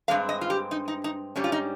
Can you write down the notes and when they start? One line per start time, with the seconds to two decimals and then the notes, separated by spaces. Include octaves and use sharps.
0.08 G2 F3 G#3 C4 F5
0.29 D#5
0.41 F4
0.50 G4
0.71 D#4
0.88 D#4
1.04 D#4
1.36 G#2 G3 C#4
1.44 F4
1.52 D#4